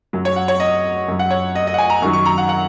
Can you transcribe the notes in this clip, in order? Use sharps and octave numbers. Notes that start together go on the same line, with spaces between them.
F#2 F#3
C#5
F#5
C#5
D#5
F#2 F#3
F#5
C#5
D#5
D#5
F#5
G#5
A#5
F#2 D#3 F#3 C#6
C#6
A#5
F#5
F#5